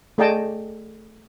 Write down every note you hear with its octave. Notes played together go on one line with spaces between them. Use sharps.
A3 G#4 D5 D#5 G5 A5